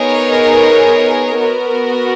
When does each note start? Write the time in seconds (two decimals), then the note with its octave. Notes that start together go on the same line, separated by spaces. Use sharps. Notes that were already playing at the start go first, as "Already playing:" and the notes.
Already playing: B3 D#4 G#4 A#4 C#5
1.39 B3 F#4 A#4